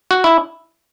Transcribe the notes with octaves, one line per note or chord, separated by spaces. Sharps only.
F#4
E4